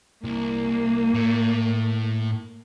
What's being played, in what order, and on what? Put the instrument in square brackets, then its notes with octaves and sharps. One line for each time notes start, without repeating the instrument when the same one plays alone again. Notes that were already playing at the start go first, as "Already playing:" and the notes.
[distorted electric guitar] C2 [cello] A#3
[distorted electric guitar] A2